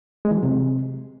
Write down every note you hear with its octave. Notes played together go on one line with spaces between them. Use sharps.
G#3
E3
F#3
C3